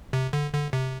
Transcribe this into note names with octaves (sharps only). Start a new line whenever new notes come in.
C3
D3
D3
C3